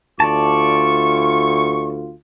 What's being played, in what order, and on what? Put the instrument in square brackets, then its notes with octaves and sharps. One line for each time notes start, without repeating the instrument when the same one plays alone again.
[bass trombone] D2 [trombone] F4 [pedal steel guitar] D5 A5 [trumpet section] C#6